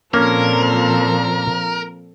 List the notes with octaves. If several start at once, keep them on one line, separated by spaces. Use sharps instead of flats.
A#2 F3 A#3 C4 C#4 A4 A#4